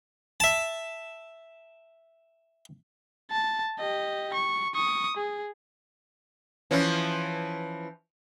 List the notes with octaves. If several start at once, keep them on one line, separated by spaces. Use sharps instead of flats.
E5 A5
A5
G4 D#5
C#6
C#6 D#6
G#4
E3 F3 C#4